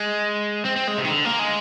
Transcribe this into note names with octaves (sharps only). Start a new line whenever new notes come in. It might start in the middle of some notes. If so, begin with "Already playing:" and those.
Already playing: G#3
C4
C4
G#3
C3
D#3
D3
A#3
G#3